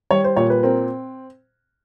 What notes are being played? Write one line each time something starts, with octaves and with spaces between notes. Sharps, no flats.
G3 C#5
C5
A#2 C#5
B4
C4 A#4